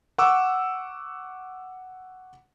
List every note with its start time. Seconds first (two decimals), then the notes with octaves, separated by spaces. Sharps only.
0.18 F#5 C#6 D6 E6